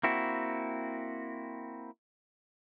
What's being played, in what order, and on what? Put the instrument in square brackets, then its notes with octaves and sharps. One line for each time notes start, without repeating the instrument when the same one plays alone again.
[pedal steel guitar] A#3 C4 E4 F#4